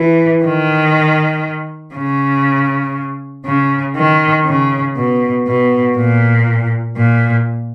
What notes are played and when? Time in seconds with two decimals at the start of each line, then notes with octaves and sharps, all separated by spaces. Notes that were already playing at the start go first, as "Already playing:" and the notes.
Already playing: E3
0.44 D#3
1.95 C#3
3.46 C#3
3.97 D#3
4.46 C#3
4.97 B2
5.48 B2
5.97 A#2
6.97 A#2